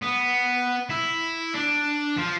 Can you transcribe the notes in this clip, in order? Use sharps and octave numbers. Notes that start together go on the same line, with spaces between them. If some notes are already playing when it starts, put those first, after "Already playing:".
B3
E4
D4
F3